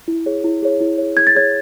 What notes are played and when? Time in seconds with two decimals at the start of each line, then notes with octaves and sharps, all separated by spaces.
0.08 E4
0.26 G#4 C#5
0.44 E4
0.62 G#4 C#5
0.81 E4
0.98 G#4 C#5
1.17 E4 G#6
1.27 A6
1.35 G#4 C#5 G#6